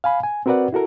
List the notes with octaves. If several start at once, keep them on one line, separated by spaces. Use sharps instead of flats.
F5 G#5 B5
G#5
C4 F#4 A#4 B4 D5 F#5
E4 F#4 A4 A#4